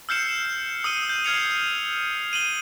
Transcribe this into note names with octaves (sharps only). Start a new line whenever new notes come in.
E6 F6 G6 C7 C#7 E7
D#6 E6 D#7 G7
G6
F6 G#6 C7 C#7 F7
D#7 F#7 G7